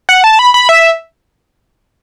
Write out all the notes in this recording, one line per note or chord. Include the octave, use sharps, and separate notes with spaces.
F#5
A5
B5
B5
E5